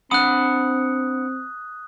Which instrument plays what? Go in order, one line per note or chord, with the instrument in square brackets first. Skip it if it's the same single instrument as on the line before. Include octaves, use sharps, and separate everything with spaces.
[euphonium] C4 [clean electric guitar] D4 F#5 B5 [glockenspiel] D#6 F#6